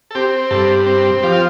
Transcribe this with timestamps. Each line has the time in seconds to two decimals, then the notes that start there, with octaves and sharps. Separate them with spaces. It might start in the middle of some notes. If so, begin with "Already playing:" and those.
0.11 A4
0.15 C4 G4
0.51 G2 A4
0.86 C4
1.23 F3 G4
1.32 F4